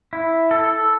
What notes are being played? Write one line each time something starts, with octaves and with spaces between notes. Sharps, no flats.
E4
A4